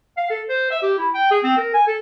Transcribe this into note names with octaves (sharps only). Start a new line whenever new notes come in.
F5
A4
C5
E5
G4
E4
G5
G#4
C4
A#4
G#5
A4